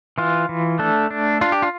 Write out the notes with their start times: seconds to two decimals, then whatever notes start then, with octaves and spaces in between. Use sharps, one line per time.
0.18 E3 F4
0.49 E3
0.79 A3 D4 A4
1.11 D4
1.41 D4 F4
1.52 G4
1.62 F4